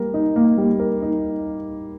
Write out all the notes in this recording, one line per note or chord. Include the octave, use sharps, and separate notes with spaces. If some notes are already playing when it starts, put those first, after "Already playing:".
Already playing: G3 A#3 A#4
D#4
A#3
G3
A#4
D#4